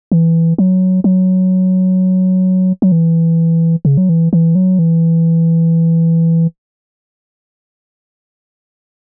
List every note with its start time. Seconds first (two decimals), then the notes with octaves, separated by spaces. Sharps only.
0.12 E3
0.58 F#3
1.04 F#3
2.82 F#3
2.92 E3
3.85 C#3
3.98 F#3
4.09 E3
4.33 E3
4.55 F#3
4.79 E3